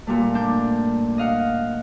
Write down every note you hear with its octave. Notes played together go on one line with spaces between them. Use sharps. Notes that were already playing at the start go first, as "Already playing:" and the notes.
A#2 G3 A3
D4 G6
D#5 F5 F#5